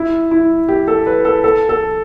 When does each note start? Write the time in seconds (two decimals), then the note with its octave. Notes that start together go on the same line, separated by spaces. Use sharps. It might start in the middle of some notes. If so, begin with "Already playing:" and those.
Already playing: E4
0.31 E4
0.68 G4
0.88 A4
1.07 B4
1.25 A4
1.44 A4
1.69 A4